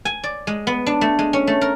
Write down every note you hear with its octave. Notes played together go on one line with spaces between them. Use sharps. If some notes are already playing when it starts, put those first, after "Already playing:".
G#5
D5
G#3
B3
D4
A3
G#3
C#4
A3
A#4